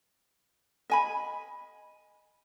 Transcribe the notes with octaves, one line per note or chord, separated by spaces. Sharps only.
D#5 G#5 B5